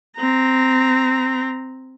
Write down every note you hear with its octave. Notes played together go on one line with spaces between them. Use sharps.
C4 A#5